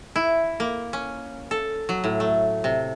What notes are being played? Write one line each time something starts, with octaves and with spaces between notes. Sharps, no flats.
E4
A#3
C#4
A4
F#3
A2
A3
C3